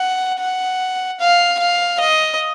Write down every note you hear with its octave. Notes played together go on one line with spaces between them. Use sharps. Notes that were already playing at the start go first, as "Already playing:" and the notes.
Already playing: F#5
F#5
F5
F5
D#5